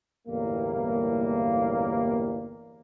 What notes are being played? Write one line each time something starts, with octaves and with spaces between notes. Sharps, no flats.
G1 E2 A2 G3 A#3